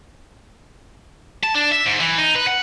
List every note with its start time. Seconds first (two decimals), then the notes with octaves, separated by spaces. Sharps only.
1.43 A5
1.55 D4
1.71 E5
1.85 G#2
2.00 E3
2.18 D#4
2.35 B4
2.47 F#5